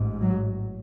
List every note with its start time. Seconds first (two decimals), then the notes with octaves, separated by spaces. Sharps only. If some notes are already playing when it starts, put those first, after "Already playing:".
Already playing: A1 G#2
0.20 F#3